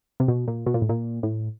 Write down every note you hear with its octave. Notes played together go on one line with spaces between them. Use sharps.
C3
B2
A#2
B2
A#2
A2
A#2
A2